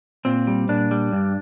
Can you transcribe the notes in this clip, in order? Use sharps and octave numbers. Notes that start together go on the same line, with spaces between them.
A#2 C4
G3
A#2 D4
G3
G2